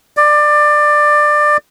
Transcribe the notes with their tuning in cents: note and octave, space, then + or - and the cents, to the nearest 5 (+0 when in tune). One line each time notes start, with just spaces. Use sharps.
D5 +20